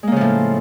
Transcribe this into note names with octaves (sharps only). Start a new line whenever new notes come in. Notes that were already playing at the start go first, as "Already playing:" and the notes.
A2 C#3 F3 G#3 A#3